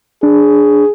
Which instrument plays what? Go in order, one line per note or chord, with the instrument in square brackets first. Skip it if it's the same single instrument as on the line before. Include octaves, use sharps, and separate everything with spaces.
[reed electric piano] D4 [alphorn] G#4